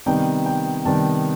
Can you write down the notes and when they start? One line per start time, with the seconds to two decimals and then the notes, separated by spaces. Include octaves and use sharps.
0.06 C3 D#3 G3 B3 D#4 G5
0.46 G5
0.85 C3 D#3 G3 B3 D#4 A5